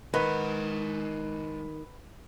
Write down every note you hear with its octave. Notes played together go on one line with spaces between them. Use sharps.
D#3 G#3 B4 F#5